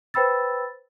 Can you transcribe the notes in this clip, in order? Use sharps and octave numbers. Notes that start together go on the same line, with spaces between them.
B4 C5 G5 B5 E6 A6